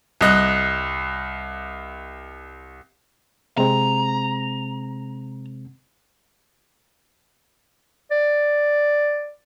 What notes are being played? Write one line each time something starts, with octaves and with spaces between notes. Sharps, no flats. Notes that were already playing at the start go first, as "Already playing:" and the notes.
C2 D#5 F#6
C3 G#3 C4 A#5
D5